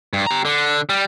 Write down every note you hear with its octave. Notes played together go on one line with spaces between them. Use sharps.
G2
G4 A#5
D3
G3